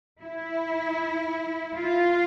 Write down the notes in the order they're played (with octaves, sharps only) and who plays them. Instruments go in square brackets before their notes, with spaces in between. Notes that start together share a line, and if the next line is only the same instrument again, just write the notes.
[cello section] E4
F4